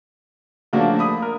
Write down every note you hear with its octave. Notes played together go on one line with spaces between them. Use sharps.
C#3 F3 A3 A#3 D4 F#4
B5 D#6
A#4